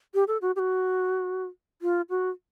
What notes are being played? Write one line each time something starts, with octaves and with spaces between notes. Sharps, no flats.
G4
A4
F#4
G4
F#4
F4
F#4